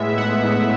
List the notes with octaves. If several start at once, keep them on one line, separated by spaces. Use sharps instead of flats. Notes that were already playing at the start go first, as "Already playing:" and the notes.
Already playing: A2 G#3 B3 E5
A2 F#5
A2